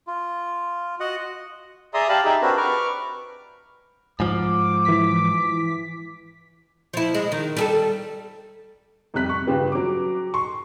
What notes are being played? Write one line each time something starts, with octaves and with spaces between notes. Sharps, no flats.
F4
F#4 D#5 F#5
G#4 D5 E5 A#5 C6 D#6
G4 D5 F5 A5 B5
D#4 G4 G#4 E5
C4 D4 F#4 A#4 B4
B4 C#6 D6 F6
G#2 F3 D6
E3 B6
F3 E4
G#3
D#3
G3 G#4 A4
F2 C3 G3 F#6 B6
C#6
G2 C#3 F4 G4 B4
F#3 D6
C6 C#6